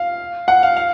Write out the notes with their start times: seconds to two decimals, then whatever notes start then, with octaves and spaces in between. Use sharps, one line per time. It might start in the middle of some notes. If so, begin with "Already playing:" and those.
Already playing: F5
0.48 F#5
0.63 F5
0.76 F5